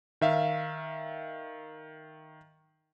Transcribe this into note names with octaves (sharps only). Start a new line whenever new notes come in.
D#3 E5 F5